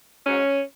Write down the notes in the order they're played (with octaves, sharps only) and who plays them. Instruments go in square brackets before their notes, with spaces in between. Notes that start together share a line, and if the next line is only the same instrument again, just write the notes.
[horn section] G#2 F#3 C#4